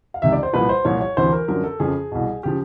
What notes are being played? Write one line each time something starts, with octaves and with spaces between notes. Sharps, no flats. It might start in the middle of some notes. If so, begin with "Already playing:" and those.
F5
C#2 C3 D#3 E5
D5
C5
C2 A#2 F3 B4
C5
C2 A#2 F3 C#5
C#5
D2 C3 E3 C5
A#4
F#2 D3 F3 A#4
A4
F2 C#3 F3 G#4
C2 B2
C#3 F3 G4